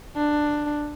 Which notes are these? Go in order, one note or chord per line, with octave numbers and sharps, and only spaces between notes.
D4